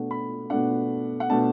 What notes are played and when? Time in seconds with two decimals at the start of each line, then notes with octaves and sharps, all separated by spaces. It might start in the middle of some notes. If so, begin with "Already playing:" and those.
Already playing: B2 A3 D4 F#5
0.11 B5
0.50 B2 A3 D4 F#5
1.20 F#5
1.29 B2 A3 D4 A5